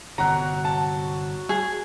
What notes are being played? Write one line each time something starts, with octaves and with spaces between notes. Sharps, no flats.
G1 C3 F#3 F#4 F#5 A#5
A5
G#4